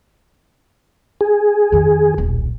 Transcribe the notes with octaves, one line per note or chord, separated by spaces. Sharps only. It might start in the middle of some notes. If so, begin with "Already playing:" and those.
G#4
F2 D#3
D#1 B1